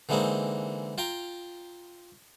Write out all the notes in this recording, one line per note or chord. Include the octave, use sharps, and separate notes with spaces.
D3 E3 G#3 A#3 C4 D#4
F4 G5 A#5